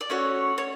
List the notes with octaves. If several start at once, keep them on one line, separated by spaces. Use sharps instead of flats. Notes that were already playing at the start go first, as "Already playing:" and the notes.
D5
A3 C#4 F#4 C#5
C#5